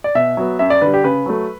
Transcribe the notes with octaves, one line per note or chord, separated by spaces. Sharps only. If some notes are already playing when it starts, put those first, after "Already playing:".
D5
B2 E5
F#3 B3
F#2 E5
D5
D3 G3 B4
G4
C#3 B4
F#3 A3